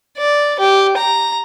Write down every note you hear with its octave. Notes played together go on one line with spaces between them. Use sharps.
D5
G4
A#5